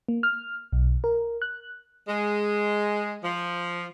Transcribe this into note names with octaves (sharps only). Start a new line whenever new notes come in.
A#3
F6
B1
A#4
F#6
G#3
F3